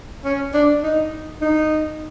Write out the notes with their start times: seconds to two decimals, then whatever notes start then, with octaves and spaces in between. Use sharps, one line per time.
0.25 C#4
0.54 D4
0.83 D#4
1.42 D#4